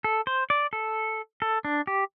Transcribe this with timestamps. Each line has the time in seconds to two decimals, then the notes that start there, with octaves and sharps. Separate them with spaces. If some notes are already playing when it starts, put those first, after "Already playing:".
0.04 A4
0.27 C5
0.50 D5
0.73 A4
1.42 A4
1.65 D4
1.87 G4